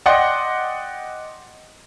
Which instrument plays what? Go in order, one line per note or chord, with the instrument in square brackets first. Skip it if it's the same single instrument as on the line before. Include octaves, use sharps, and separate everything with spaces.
[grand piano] D5 D#5 F#5 G5 C6 A#6